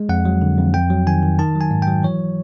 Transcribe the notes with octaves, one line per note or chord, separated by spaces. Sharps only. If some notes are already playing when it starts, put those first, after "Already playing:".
Already playing: G#3
F2 F#5
F#3
D3
F2
F2 G5
F#3
D#3 G#5
D#3
D#3 A5
F#3
G#5
G#2
G5
F#3
E3 C#5